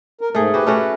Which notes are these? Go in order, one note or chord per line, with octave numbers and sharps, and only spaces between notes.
A#4
G#2 A3 G#4
F#4 G4 B4
A3 C#4 F#4